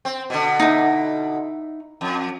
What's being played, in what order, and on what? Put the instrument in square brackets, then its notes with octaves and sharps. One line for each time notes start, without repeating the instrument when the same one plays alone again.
[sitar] C4
B2 D3
[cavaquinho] D#4 E4
[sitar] F2